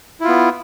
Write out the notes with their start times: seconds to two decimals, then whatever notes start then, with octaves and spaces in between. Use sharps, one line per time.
0.21 E4
0.24 F4
0.28 B3